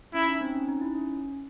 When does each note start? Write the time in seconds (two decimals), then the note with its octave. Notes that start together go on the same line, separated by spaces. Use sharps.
0.14 C#4 E4
0.28 D#4
0.41 C4
0.54 C#4
0.68 D#4
0.81 E4
0.95 C#4